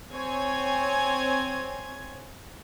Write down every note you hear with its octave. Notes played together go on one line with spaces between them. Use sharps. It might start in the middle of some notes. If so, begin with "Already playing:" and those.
C4 C#5 G#5 G#6